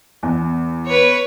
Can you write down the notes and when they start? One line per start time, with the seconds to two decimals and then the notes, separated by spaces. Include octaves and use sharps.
0.23 E2
0.86 B4 C#5